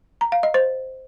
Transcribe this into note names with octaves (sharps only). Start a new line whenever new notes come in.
A#5
F5
D#5
C5